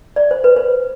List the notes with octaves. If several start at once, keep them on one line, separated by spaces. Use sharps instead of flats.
D5
C5
B4
C5